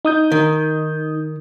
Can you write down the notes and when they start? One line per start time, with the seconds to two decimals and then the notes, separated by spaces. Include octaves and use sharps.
0.05 D#4 D#6 G6
0.32 D#3